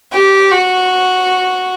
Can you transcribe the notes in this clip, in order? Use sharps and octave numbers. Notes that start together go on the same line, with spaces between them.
G4
F#4